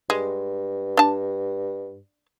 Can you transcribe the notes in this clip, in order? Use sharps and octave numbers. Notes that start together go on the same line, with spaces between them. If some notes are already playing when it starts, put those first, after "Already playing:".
G2 G#3
D4 A5